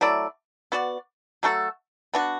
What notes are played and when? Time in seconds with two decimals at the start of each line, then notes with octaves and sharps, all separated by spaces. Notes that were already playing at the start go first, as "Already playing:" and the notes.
0.01 F#3 A3 E4 D5
0.72 B3 F#4 D5
1.43 F#3 A3 F#4 A4
2.14 B3 D4 F#4